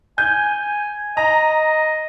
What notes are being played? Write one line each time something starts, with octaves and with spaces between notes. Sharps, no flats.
G#5 G6
D#5 A#5